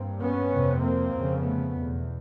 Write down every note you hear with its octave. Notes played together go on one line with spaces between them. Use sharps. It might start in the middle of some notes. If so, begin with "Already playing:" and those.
Already playing: G2 A#3 C4
B3 C#4
F2 C3
A#3 C4
F2 C#3
A3 B3
E2 B2